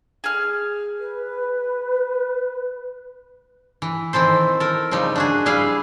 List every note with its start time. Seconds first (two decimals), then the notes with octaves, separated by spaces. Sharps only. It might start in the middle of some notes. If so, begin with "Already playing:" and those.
0.24 G#4 F6
0.99 B4
3.82 E3
4.13 D#3 E3 C4 A4 C5
4.60 A4 A#4
4.91 C#3 F3 G3 D#4
5.16 D4 F#4 G#4
5.46 G3 E4 G#4 F5